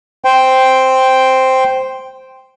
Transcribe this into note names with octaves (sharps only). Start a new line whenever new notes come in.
C5 G5